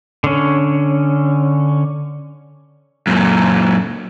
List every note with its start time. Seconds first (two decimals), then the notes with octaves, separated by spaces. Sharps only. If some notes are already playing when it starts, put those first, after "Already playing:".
0.24 D3 C#4
3.07 F#2 A#2